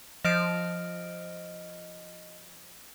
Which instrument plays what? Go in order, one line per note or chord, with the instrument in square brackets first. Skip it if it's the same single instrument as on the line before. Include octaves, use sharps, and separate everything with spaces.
[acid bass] F3 [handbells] D#5 F6 D7